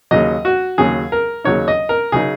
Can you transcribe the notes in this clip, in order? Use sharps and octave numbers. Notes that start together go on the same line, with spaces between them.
D#2 C#3 F#3 D#5
F#4
D#2 C#3 F#3 G#4
A#4
D#2 C#3 F#3 D#4 C#5
D#5
A#4
C#3 F#3 D#4 G#4